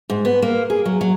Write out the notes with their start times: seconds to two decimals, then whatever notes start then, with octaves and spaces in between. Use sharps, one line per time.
0.10 G#2
0.25 B3
0.42 A#3
0.70 G#4
0.86 F#3
1.01 F#3